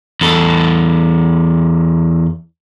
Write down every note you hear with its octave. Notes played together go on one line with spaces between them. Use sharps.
E2 A4